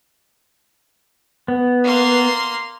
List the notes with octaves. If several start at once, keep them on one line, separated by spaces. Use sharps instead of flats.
B3
A#3 C6